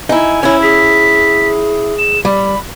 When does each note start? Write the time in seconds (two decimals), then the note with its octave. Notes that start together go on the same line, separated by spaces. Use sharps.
0.09 D#4 E4 G#5
0.43 C#4 E4 C#5
0.62 G#4 B6
1.98 E7
2.25 G3 B5